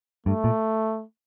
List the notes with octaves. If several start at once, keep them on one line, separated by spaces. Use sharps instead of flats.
G2 A3
A#2